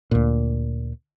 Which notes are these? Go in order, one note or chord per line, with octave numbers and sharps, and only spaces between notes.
D2 A#2